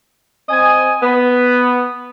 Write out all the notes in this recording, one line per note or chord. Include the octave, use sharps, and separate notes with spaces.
C4 D#5 G#5
B3